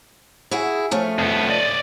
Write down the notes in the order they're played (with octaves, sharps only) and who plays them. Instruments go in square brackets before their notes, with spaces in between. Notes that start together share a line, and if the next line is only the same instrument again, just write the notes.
[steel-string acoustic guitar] E4 F#4 G#4
F3 A3 C#4
[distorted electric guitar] F2 B3
D5 D#5